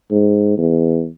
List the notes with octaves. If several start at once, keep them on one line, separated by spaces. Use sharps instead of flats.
G#2
E2